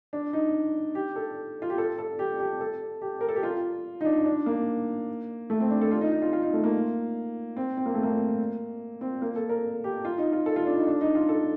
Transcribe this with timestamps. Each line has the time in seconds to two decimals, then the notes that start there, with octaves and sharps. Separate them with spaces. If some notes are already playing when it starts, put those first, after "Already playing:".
0.13 D4
0.33 D#4
0.95 G4
1.16 A4
1.62 F4
1.70 G4
1.78 A4
1.98 A4
2.19 G4
2.40 G4
2.61 A4
3.01 G4
3.21 A#4
3.29 A4
3.36 G4
3.43 F4
4.01 D#4
4.05 D4
4.26 D4
4.46 A#3
5.50 A3
5.60 C4
5.71 D4
5.81 A4
5.91 F4
6.01 D#4
6.12 D#4
6.22 F4
6.33 F4
6.43 D#4
6.53 A3
6.64 A#3
7.57 C4
7.77 C4
7.86 A#3
7.95 A3
8.03 A#3
9.01 C4
9.22 A#3
9.36 A4
9.49 A#4
9.84 G4
10.05 F4
10.18 D#4
10.32 F4
10.46 A4
10.56 F4
10.67 D4
10.77 D#4
10.87 D4
11.01 D#4
11.15 F4
11.29 A4